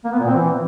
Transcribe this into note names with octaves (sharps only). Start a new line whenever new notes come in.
A#3
B3
A#2
C4
E3